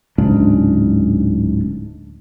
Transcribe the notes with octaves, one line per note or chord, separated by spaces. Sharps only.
D1 G#2 C#3 D4